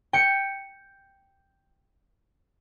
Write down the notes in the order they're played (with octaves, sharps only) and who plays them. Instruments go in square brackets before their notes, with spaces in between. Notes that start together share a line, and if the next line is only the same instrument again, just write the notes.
[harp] G5 C#7